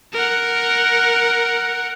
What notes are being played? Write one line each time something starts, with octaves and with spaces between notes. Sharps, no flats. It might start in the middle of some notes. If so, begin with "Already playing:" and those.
A#4 F#5